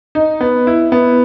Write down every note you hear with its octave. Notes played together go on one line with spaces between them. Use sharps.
D#4
B3
E4
B3